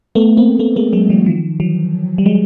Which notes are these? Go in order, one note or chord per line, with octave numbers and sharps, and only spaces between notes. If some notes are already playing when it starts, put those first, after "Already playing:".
A3 B3
A#3 C4
A3 B3
G#3 A#3
F#3 G#3
E3 F#3
D#3 F3
E3 F#3
G3
F#3 G#3